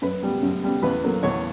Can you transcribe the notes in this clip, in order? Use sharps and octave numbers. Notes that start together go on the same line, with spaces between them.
F#2 B4
C#3 G3 B3
F#2
C#3 G3 B3
E2 B4
D3 F#3 A#3
E2 C#5